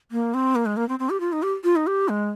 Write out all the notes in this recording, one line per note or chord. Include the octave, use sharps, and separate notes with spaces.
A#3
C4
A#3
G#3
A#3
C4
C4
G4
F4
D#4
G4
F4
D#4
G4
G#3